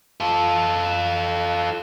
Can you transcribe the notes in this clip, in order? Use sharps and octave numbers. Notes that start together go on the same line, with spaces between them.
F4 A4